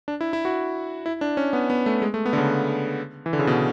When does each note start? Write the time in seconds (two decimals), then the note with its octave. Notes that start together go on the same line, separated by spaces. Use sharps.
0.08 D4
0.21 E4
0.33 E4
0.45 F#4
1.06 E4
1.21 D4
1.37 C#4
1.53 B3
1.70 B3
1.86 A3
2.02 G#3
2.14 A3
2.26 B3
2.33 D3
2.38 C#3
3.26 E3
3.33 D3
3.39 C#3
3.47 B2